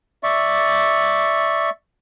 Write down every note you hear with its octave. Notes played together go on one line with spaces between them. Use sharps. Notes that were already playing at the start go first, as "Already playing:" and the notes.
D5 E5 C#6